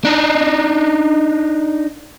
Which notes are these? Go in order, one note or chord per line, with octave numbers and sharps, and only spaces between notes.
D4 D#4